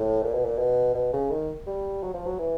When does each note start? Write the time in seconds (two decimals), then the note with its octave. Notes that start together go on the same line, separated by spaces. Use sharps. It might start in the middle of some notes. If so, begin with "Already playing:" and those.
Already playing: A2
0.23 A#2
0.34 B2
0.45 A#2
0.58 B2
0.95 B2
1.13 C#3
1.31 D#3
1.67 G3
2.03 F#3
2.14 F3
2.26 F#3
2.39 E3